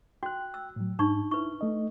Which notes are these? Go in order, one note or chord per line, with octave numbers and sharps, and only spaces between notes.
F#4 G5 F#6
E6
A2 F#3
G#2 D4 D#4 C#6
E4 B4 C#6
A3 D#5